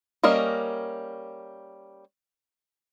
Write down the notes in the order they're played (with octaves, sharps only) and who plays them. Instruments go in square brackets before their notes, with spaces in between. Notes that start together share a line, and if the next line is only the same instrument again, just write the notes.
[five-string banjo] G3 A#3 C#4 A#4 D#5